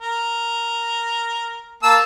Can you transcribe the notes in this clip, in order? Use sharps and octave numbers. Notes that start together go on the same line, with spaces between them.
A#4
A#3 A5 E6